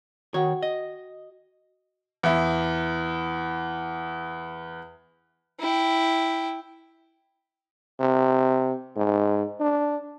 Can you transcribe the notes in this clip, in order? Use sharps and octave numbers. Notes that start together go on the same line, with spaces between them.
D#3 F#4 C#5 F#5 G5
D#5
E2 E4
E4 G5
C3
G#2
D4